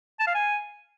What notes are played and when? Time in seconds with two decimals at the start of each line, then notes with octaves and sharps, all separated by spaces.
0.19 A5
0.27 F5
0.34 G#5